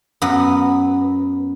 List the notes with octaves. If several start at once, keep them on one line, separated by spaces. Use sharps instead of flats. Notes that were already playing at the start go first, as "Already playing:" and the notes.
F#2 B3